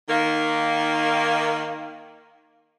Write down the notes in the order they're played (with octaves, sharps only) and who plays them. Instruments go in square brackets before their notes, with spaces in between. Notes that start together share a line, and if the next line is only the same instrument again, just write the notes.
[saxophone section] D#3 A#3